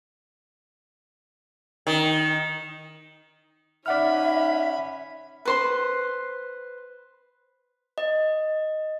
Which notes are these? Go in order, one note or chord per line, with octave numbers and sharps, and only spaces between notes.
D#3
C#4 D#4 D5 E5 F#5 B5 F6
B4 C5 C6
D#5